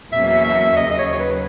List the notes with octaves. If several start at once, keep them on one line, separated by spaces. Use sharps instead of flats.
E2 B2 F#3 A#3 C#4 E5
E5
E5
E5
D#2 C#3 F#3 D#5
D#5
C#5
C#5
B4